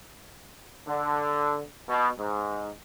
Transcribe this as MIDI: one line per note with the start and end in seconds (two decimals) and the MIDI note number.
0.86 1.63 50
1.89 2.09 47
2.17 2.69 44